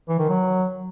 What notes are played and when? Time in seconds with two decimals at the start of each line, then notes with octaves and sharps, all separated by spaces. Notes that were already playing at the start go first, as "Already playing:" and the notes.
0.09 E3
0.19 D#3
0.29 F#3